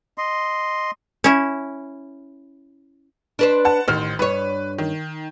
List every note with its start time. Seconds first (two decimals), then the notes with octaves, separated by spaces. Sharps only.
0.18 D#5 C6
1.24 C#4 E4
3.39 D4 B4 C5
3.65 F#5 A5
3.88 A1 D#3 C5 F6
4.19 G2 B4 C#5
4.78 D#3